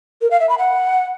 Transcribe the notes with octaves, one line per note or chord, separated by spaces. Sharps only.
A#4
F5
E5
B5
F#5